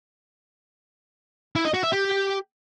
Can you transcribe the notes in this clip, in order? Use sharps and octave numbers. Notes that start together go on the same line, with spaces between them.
E4
D#5
F#4
E5
G4